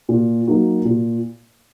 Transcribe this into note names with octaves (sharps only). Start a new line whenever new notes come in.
A#2
F#3 A#3 D#4 F#4
A#2